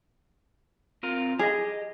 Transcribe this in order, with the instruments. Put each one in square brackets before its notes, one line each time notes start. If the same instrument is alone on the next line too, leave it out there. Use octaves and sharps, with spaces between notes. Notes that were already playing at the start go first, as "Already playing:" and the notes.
[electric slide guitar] C4 F4 A#4
[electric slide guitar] G4 D#5 [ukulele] G#4